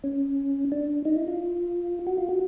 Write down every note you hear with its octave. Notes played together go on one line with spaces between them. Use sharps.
C#4
D4
D#4
E4
F4
F#4
F4
F#4